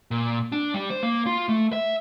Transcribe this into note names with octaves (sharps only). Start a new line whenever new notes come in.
A#2
D4
G3
C5
A#3
F4
A3
E5